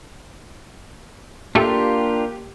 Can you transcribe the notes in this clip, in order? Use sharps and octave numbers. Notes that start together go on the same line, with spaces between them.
A#2 A3 A#3 D4 F4 G4